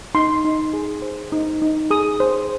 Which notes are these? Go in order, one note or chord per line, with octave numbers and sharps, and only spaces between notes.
D#4 C6
D#4
G#4
C5
D#4
D#4
G#4 D#6
C5